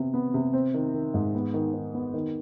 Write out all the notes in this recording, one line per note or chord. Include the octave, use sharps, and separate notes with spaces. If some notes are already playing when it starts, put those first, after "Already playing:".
Already playing: C3 B3
B3
C3
C4
D#3
D#3
G#2
B3
D#3
D#3
B3
D#3